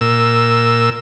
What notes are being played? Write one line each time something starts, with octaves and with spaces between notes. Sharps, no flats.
A#2 E6